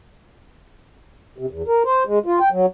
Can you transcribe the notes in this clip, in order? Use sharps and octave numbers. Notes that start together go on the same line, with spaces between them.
C3
E2
A#4
C5
G#3
F4
G5
F#3